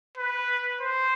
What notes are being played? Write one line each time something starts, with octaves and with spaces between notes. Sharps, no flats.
B4
C5